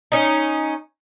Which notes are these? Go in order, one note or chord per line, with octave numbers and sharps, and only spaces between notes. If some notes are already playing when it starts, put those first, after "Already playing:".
C#4 D#4